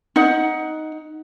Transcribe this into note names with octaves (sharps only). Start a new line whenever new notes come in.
D#4 F#5